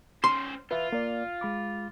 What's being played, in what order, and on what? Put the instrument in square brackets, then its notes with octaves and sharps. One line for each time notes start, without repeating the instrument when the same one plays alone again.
[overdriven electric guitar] C#4 C5 [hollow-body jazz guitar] C6
[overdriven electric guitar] F4 [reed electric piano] B4 E5 B5
[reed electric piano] A#3 D5
G#3 B5 D6